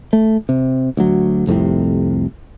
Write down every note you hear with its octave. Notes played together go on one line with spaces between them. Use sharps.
A3
C3
D2 F#3
C2 F2 A2 C3